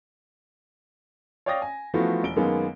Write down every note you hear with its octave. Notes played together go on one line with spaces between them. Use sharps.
C#5 D5 F5 G5 D#6 A#6
G#5
E3 F3 A3 B3 F4 F#4
E1 D7 G7
F#2 D#3 G#3 A#3 B3